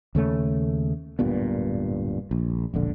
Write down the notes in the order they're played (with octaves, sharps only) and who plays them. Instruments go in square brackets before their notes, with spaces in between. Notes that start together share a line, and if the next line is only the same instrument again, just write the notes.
[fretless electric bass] D#2 C#3 A3 C#4
D1 G2 A#2 B3
A#1
E1 A#1 D3